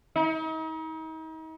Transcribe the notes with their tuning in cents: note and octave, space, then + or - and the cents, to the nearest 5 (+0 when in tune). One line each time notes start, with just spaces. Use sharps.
D#4 +40